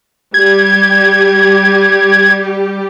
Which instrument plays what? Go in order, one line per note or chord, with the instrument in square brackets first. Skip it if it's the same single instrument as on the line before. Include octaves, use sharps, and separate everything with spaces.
[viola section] G3 G4 [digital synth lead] G#6